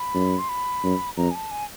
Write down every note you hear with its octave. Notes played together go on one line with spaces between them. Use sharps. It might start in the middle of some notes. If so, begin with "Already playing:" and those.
Already playing: B5
F#2
C6
B5
F#2
F2 A#5
G#5
A5
G#5